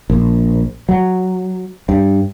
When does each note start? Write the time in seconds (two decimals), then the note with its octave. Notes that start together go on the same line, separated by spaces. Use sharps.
0.10 A#1
0.89 F#3
1.89 G2